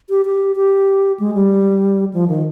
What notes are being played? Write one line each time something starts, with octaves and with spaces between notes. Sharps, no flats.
G4
G4
G4
G#3
G3
F3
D#3